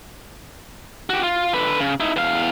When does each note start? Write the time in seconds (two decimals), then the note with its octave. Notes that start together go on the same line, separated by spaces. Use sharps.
1.10 F#4 G4
1.23 F4
1.53 D3 B4
1.80 C#3
2.00 D#4 E4
2.16 E2 F5